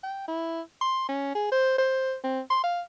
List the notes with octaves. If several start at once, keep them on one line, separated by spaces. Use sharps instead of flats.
G5
E4
C6
C#4
G#4
C5
C5
C4
C6
F5